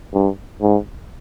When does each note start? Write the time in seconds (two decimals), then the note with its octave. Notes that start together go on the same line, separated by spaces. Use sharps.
0.14 G2
0.62 G#2